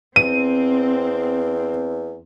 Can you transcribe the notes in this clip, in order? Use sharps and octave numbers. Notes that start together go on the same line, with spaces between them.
E2 C4 D#7